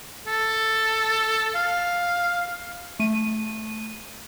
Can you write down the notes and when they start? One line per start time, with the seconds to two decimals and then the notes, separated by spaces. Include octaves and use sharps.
0.27 A4
1.55 F5
3.00 A3 D#7